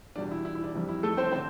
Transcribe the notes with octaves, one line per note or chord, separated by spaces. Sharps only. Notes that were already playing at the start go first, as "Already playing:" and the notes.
E2 B2 G3 D4
E4
E4
E4
D4
F2 C3 G3
E4
A3 A4
C4 C5
D3 C4 C5